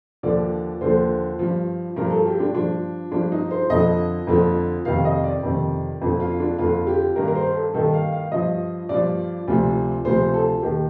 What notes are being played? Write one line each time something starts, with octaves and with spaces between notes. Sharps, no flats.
D#2 D3 F3 D5
D#2 D3 F3 C5
G2 F3
G2 F3 A#4
A4
G4
D4
G2 F3 D4
G2 F3 D4
D#4
C5
F2 D3 F3 D#5
F2 D3 F3
F2 C3 D#3 F5
D#5
D5
F2 C3 D#3
F2 D3 F3
F4
D4
F2 D3 F3 F4
G4
G2 D#3 A#4
A#4
C5
A4
G2 D#3 A4
F5
F5
G2 F3 D#5
G2 F3 D5
D2 C3 F3
D2 C3 F3 C5
A4
D#2 D#3 G4